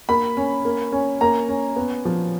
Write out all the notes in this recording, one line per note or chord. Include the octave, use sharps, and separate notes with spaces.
A#3 B5
C#4
A#3
C#4
A#3 A#5
C#4
B3
F3